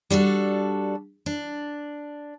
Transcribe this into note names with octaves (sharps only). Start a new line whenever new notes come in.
G3 D4 F#4 A4
D4